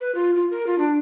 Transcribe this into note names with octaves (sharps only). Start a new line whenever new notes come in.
B4
F4
F4
A#4
F4
D4